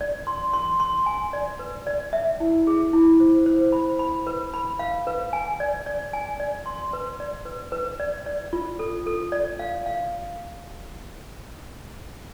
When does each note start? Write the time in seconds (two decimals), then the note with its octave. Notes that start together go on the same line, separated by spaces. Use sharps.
0.01 D5
0.27 C6
0.53 C6
0.80 C6
1.06 G#5
1.33 D5
1.59 B4
1.87 D5
2.13 E5
2.40 E4
2.67 G#4
2.93 E4
3.20 C5
3.46 C5
3.72 B5
3.99 B5
4.27 B4
4.54 B5
4.79 F5
5.07 B4
5.33 G#5
5.60 D5
5.86 D5
6.13 G#5
6.40 D5
6.66 C6
6.93 B4
7.20 D5
7.46 B4
7.72 B4
8.00 D5
8.26 D5
8.53 F4
8.79 A4
9.06 A4
9.32 D5
9.59 F5
9.86 F5